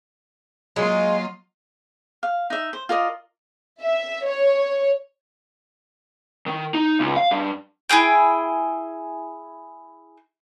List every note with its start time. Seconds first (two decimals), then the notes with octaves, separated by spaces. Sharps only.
0.76 F#3 G#3 A#3 F4 D#5
2.23 F5
2.50 D#4 E5
2.73 C5
2.89 F4 A#4 D5 D#5
3.81 E5
4.26 C#5
6.48 D#3
6.75 D#4
7.00 C#2
7.16 F5
7.31 G2
7.89 E4 G4 G#4 G5